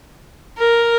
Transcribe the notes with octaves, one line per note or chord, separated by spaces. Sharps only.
A#4